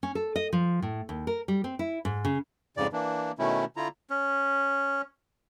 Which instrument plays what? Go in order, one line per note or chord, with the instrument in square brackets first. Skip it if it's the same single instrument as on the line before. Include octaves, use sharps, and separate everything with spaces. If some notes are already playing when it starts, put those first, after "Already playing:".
[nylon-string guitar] C#4
A4
D#5
F3
A2
D#2
A#4
G3
C4
E4
G#2
C#3
[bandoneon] F2 G#2 C#3 D5
E3 A#3 D4
B2 D#3 A3 C#4 E4
D3 E4 F4 A#5
[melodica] C#4